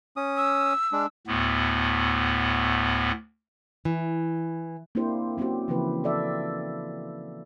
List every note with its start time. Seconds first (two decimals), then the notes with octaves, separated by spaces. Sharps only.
0.17 C#4 D#6
0.37 E6
0.92 G#3 D4
1.27 D2 A2 B3
3.85 E3
4.95 A#3 C4 D4 E4 G4 C5
5.38 A#3 C4 C#4 F#4 G4
5.68 C#3 E3 F3 A#3 E4 B4
6.04 A4 D5 E5